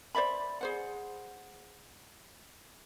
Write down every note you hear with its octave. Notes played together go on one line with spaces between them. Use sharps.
C5 D5 E5 B5
G#4 C5 F#5